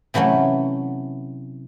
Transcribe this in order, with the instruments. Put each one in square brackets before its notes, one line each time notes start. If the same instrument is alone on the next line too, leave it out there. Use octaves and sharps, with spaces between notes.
[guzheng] C3 E3 F#3 A3 C#4